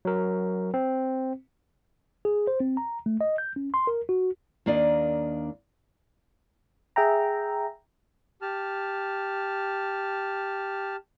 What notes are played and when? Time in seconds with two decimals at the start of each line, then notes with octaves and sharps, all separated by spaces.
0.05 F#3 A#4
0.74 C4
2.25 G#4
2.47 C5
2.60 C4
2.77 A#5
3.06 A3
3.21 D#5
3.38 G6
3.56 C#4
3.74 C6
3.87 A#4
4.09 F#4
4.66 D#2 A#3 D4 D5 D#5
6.96 G#4 E5 G5 A#5
8.42 G4 A5 F6